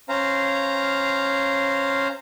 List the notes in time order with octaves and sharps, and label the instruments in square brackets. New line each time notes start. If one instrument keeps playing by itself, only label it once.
[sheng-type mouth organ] C#4 C5 F5 A#5